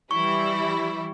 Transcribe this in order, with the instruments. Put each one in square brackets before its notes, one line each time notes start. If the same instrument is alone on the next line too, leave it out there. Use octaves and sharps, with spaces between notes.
[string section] E3 G3 E4 [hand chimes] C#6